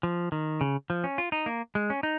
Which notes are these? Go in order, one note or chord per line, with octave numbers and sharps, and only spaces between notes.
F3
D#3
C#3
F3
C#4
F4
D#4
A#3
G#3
C#4
D#4